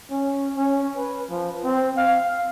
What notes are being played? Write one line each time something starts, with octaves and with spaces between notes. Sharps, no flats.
C#4
C#4
B4
F3
C4
F5